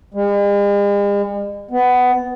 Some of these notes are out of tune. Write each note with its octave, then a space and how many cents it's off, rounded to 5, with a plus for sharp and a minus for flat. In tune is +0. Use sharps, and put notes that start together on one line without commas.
G#3 -45
B3 +15